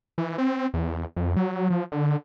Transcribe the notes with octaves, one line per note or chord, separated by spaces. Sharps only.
E3
C4
E2
F2
F#3
F3
D3